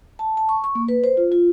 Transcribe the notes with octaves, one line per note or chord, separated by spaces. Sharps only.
A5
A5
C#6
C#6
A#3
B4
C5
F4
F4